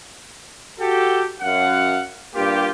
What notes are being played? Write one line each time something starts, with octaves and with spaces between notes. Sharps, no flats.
F#4 G4 A4
F#2 F5 F#5
G2 A#3 F4 G4